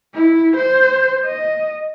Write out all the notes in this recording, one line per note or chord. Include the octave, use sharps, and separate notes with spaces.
E4
C5
D#5